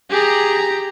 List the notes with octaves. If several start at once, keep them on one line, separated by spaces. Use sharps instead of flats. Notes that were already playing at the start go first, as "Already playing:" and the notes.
G4 G#4 A#5